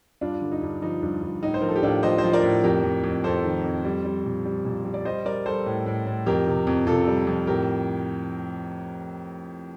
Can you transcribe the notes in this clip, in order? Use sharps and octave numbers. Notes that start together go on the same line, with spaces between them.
G2 D4 F4
D3
D#4
G2
F3 D#4
G2
G2
A2 D#4
C5
F3 A#4
A4
G4
A2 D4 F4
F3 C5 D#5
C5 D#5
F3
A#4 D5
A2
F2 G4 A#4
F2
F2
F2 A4 C5
D#3
F2
G3
G3
A#2
G3
A#2
G3
D5
G3 C5 D#5
G3 A#4 D5
G3 A4 C5
A2
A2
A2
F2 G4 A#4
C3
F2
C3 F4 A4
G3
F2
A2 G4 A#4